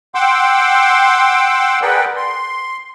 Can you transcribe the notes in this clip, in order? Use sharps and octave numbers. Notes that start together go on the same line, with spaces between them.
F#5 G5 C6 D6 E6
G#4 A#4 B4 D5 F#5 G5
C6